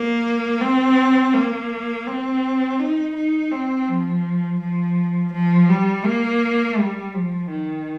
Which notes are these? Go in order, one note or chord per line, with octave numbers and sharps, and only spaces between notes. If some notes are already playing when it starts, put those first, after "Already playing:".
Already playing: A#3
C4
A#3
C4
D#4
D#4
C4
F3
F3
F3
G3
A#3
G3
F3
D#3